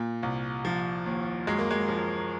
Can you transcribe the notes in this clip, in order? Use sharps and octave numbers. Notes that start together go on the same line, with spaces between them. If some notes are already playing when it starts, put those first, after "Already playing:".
Already playing: A#2
C2
F3
D#2
F#2 G#3
A#3
G#3
F3